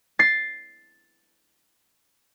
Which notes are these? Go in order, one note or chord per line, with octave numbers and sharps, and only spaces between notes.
A6 C7